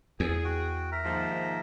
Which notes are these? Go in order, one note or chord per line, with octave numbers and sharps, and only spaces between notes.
E2 G#4
F#4 G5
A#4 E5 A#5
D#2 G#2 F3